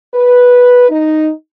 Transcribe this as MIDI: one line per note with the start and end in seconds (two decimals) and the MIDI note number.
0.15 0.86 71
0.89 1.29 63